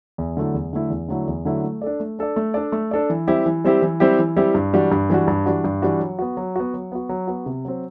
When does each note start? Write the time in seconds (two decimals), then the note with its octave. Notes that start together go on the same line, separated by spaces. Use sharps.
0.18 E2
0.37 D3 F#3 A3 E4
0.54 E2
0.73 D3 F#3 A3 E4
0.90 E2
1.08 D3 F#3 A3 E4
1.27 E2
1.45 D3 F#3 A3 E4
1.64 A3
1.82 D4 A4 D5
2.00 A3
2.19 D4 A4 D5
2.36 A3
2.54 D4 A4 D5
2.72 A3
2.91 D4 A4 D5
3.10 E3
3.27 G3 C4 E4 G4
3.46 E3
3.64 G3 C4 E4 G4
3.82 E3
4.00 G3 C4 E4 G4
4.19 E3
4.36 G3 C4 E4 G4
4.55 G2
4.73 E3 G3 D4 F#4
4.91 G2
5.10 E3 G3 D4 F#4
5.28 G2
5.46 E3 G3 D4 F#4
5.64 G2
5.82 E3 G3 D4 F#4
6.00 F#3
6.19 B3 F#4
6.37 F#3
6.56 B3 F#4
6.74 F#3
6.92 B3 F#4
7.09 F#3
7.27 B3 F#4
7.46 C3
7.65 F#3 C4